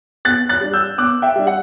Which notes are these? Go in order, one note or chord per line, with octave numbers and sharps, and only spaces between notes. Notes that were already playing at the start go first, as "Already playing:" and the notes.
B2 F#6 A6
F#6 A6
G3 D4
E6 G6
B2 D6 F#6
E5 G5
G3 D4
F#5